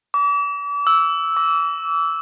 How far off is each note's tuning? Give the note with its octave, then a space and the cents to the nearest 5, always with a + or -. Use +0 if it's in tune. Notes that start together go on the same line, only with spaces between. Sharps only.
D6 -40
E6 -5
D6 -35